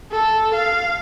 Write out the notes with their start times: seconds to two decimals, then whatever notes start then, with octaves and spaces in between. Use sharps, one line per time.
0.12 A4
0.55 F5